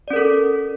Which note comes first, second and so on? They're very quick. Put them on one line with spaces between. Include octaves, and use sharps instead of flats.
D5 C#4 A#4 A4